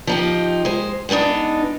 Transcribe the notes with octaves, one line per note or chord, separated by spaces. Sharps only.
F3 D#4 G4
G#3 C5
G#3 B3 C4 D4 D#4